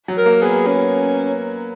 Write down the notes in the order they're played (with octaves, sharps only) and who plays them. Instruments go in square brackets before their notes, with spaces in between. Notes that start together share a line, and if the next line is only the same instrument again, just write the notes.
[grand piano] F#3
[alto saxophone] A#4
[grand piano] A#3
[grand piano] B3 [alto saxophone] G#4
[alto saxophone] C#4